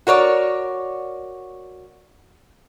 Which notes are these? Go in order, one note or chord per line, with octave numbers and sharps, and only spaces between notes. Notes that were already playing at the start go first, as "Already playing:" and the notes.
F#4 A#4 C#5 D5